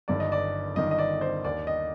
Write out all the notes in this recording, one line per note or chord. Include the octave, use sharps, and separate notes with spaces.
G1 G2 D#3 D5
D#5
D5
G1 G2 D#3 D#5
D#5
D5
C5
D#2 D#3 D5
D#5